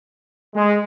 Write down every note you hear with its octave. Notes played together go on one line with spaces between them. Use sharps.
G#3